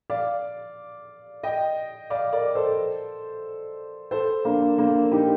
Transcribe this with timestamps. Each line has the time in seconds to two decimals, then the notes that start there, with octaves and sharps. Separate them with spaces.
0.10 D5 F5
1.43 D#5 G5
2.10 D5 F5
2.32 A#4 D5
2.55 A4 C5
4.11 A4 C5
4.45 A#3 D4
4.78 A#3 D4
5.12 D#4 G4